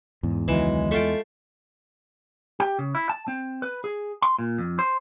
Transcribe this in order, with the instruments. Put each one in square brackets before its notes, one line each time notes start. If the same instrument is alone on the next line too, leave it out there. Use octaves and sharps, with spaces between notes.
[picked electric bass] E2 [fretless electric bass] G#2
[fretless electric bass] C#2 D#3 F#3 [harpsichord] E3 [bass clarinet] G#3
[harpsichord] A3 F4 G5
[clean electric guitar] G4
C#3
E4
A5
C4
B4
G#4
C6
A#2
F2
C5